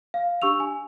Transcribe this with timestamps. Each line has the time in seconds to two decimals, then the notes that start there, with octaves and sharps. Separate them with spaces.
0.14 F5
0.42 D4 G4 C#6 E6 F7
0.60 G#5